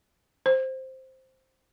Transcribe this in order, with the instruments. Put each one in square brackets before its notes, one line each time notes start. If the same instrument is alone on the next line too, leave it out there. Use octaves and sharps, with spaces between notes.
[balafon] C5